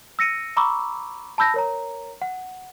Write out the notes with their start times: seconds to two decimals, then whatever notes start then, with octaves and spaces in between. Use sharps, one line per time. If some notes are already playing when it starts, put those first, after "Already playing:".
0.19 E6 A#6 C#7 D#7
0.57 A#5 B5 C#6 D6 E6
1.38 A5 B5 E6 G6 A#6
1.54 A#4 C#5 A#5
2.22 F#5